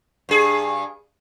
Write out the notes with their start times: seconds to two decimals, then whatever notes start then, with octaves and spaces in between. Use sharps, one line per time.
0.29 G2 G#4